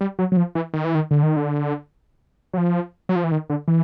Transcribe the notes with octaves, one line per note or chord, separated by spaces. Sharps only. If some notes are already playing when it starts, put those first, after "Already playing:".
G3
F#3
F#3
F3
E3
D#3
E3
D#3
D3
D#3
D3
F#3
F3
F#3
F3
E3
D#3
D3
E3